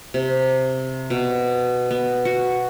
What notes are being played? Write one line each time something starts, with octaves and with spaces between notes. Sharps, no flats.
C3
B2
B3
F#4